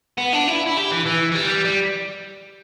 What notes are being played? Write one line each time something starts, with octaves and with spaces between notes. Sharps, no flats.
B3
D4
E4
E4
G4
E3
E3
E3
G3
G3